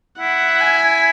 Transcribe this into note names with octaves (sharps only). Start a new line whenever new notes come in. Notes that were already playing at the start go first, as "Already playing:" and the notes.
E4 F#5
G#5